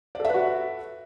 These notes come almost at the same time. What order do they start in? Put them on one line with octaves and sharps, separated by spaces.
D5 A4 E5 B4 F#4